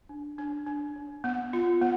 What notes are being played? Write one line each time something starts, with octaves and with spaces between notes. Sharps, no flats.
D4
D4
D4
D4
B3
F4
B3